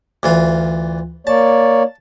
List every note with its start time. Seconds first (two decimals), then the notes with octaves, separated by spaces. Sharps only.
0.23 D2 E3 F4
1.27 A#3 C#5 D5 A5